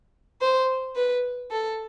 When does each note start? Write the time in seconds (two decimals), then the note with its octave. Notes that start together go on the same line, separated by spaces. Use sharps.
0.41 C5
0.96 B4
1.51 A4